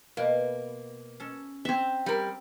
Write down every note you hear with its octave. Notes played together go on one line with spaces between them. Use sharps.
B2 A#3
C#4 A4
C4 E5
G3 A#4